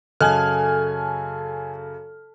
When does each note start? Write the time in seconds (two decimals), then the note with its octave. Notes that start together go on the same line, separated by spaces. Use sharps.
0.21 F#2 C#3 A4 G#5 A5 F6